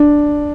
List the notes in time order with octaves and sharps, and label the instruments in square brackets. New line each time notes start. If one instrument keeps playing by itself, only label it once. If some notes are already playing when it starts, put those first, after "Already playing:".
Already playing: [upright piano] D4